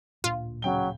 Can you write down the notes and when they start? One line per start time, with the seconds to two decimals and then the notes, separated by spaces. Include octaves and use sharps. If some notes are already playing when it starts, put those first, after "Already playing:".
0.24 D1 A#2 D4 F4
0.62 C#3 F#3 G5 G7